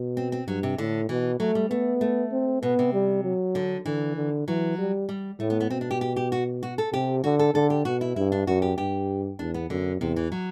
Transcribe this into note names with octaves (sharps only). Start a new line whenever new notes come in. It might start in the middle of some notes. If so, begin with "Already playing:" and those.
Already playing: B2
C4
C4
G2 F#3
C3
A2 D3
B2 E3
F#3 A3
G3
A3 B3
A3
C4
B2 B3
C3
G3
F#3
D3
D3 E3
D3
E3 F#3
G3
G3
A2 A3
B3
B3
B2 C4
D4
G4
G4
G4
F#4
F#4
A4
C3 G4
D3 F#4
A4
D3 A4
G4
B2 F#4
E4
G2 E4
D4
F#2 F#4
G4
G2 G4
E2 D4
B3
F#2 D3
E2 C3
E3
F#3